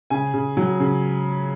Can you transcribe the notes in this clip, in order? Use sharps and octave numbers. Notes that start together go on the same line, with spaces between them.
C#3 G#5
C#3
F#3
C#3